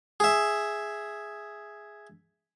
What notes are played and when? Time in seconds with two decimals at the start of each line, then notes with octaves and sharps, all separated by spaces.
0.20 G#4 E5